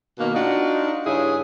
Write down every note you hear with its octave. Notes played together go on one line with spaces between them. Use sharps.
B2 D#3 A#3
D4 D#4 F4 F#4
G2 C#3 E4 G#4